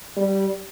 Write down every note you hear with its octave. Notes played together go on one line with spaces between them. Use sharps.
G3